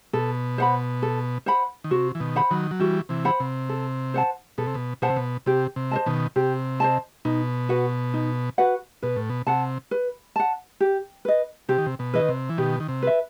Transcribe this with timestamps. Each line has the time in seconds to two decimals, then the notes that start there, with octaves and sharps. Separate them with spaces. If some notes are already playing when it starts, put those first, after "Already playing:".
0.13 B2 A4
0.58 C5 F#5 B5
1.02 A4
1.46 C5 F#5 B5
1.84 D#3
1.91 C3 F#4
2.15 E3
2.20 B2 D#3
2.36 C5 F#5 B5
2.51 D#3 F#3
2.71 F#3
2.80 E3 G3 F#4
3.09 C3 E3
3.25 C5 F#5 B5
3.40 C3
3.69 A4
4.14 C5 F#5 A5
4.58 B2 A4
4.67 C3
4.75 B2
5.02 B2 C5 F#5 A5
5.10 C3
5.16 B2
5.46 C3 G4
5.76 C3
5.91 C5 D#5 A5
6.06 B2 D#3
6.36 C3 G4
6.80 C5 D#5 A5
7.25 B2 D#4
7.69 F#4 B4 F#5
8.14 D#4
8.58 F#4 B4 F#5
9.02 B2 B4
9.16 A2
9.30 B2
9.47 C3 F#5 A5
9.91 B4
10.36 F#5 A5
10.81 G4
11.25 B4 D#5
11.69 C3 G4
11.78 D#3
11.86 C3
11.99 B2
12.14 E3 B4 D#5
12.22 D#3
12.29 C3
12.49 E3
12.58 B2 D#3 G4
12.80 D#3
12.88 C3
13.02 B4 E5